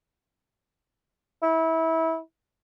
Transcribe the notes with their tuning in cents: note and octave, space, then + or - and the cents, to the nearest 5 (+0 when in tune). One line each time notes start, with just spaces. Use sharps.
E4 -25